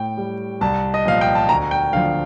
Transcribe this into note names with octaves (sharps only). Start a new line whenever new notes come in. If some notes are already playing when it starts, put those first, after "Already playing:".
Already playing: A2 G5
G3
C2 A5
D#5
A#2 F3 F5
G5
A5
D2 A#5
G5
D3 F3 F5